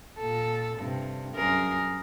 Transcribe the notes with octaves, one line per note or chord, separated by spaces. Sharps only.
A#2 A4
G2 C3
F#2 G#4 A#4